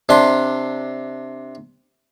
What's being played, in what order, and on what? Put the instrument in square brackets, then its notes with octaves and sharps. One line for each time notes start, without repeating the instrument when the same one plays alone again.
[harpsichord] C3 D4 C6